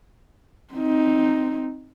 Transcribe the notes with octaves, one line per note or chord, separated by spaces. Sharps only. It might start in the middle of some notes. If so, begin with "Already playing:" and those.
C4 D#4